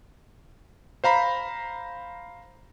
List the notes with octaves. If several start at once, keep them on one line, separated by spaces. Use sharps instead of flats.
C5 F5 A#5 B5